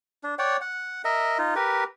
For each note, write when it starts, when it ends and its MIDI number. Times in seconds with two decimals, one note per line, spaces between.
0.23 0.35 62
0.39 0.57 73
0.39 0.57 74
0.39 0.57 78
0.39 0.57 79
0.61 1.02 78
1.04 1.38 70
1.04 1.38 75
1.04 1.38 76
1.38 1.55 63
1.38 1.55 65
1.56 1.84 67
1.56 1.84 70
1.56 1.84 71